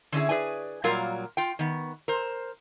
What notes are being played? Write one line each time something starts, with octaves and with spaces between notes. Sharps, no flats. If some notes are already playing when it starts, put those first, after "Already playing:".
D3 C#4 E4 G#4
G#4 B4 D5 G#5
A#2 F#3 G3 F4 A#4 F5
F4 G5
D#3 B3
A#4 C5